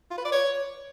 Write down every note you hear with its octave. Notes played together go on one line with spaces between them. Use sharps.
F4
B4
D5
C#5